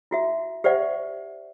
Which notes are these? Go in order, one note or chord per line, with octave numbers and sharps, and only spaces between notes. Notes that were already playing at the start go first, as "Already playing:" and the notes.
E4 F#4 E5
G4 C5 D5 E5 F#5